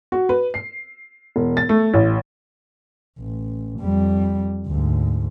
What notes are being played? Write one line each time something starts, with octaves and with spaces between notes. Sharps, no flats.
F#4
B4
C7
E1
A6
A3
A1
A1
F2 G3
D2 G#2